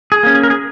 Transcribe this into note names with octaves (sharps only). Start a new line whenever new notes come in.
G#4
A#3 C#4
G#4
A#4
G#4